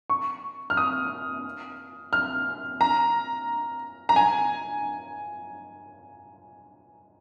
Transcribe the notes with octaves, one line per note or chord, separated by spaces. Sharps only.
C#6
F6
D#6
F6
A#5
A#5
G#5